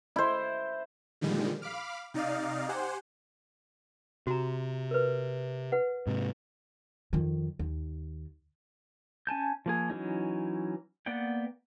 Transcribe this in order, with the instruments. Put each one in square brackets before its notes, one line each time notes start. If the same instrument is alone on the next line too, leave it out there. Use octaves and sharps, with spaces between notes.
[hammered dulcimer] E4 C5
[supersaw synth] A#2 D3 D#3 F3 G3 G#3
F5 B5 D6 F6
C3 D#4 D5 D#5 F5
G4 C5 F#5 G#5
[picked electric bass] C3 [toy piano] F#4 A#5
[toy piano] A#4 B4
B4 F#5
[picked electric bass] G#2 C3
[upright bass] F2 D#3
D#2
[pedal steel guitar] C#4 G#5 A5 G6
F3 A#3 G#4
E3 F#3 C#4 D#4
A#3 B3 D5 F#5 G5